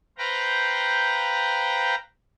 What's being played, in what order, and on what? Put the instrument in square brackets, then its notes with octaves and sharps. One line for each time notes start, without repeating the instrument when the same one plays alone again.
[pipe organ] B4 C5 F5 G5 A#5